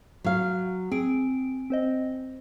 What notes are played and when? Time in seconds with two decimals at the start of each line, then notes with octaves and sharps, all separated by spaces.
0.24 F#3 F5
0.92 C4 G#4 D7
1.70 C4 C5 D#5